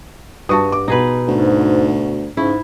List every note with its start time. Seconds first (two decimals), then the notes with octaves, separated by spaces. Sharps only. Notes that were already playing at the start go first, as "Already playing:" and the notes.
0.49 G2 F#4 A5 C#6 D#6
0.72 D6
0.88 B2 D#4 G#4 B4
1.28 D2 G#2
2.37 G#2 C#3 E4